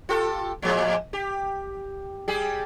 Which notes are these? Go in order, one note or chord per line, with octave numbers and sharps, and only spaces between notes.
F4 G4 A4
A2 F3 G#3
G4
G3 G4 G#4